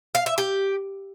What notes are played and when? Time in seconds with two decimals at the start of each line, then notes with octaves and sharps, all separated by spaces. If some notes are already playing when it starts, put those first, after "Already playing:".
0.15 F5
0.26 E5
0.38 G4